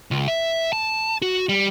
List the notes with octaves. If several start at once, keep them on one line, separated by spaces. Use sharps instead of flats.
C#2
E5
A5
F#4
G3